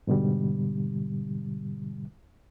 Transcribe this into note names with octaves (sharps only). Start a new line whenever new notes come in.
G#2 B2 D3 G3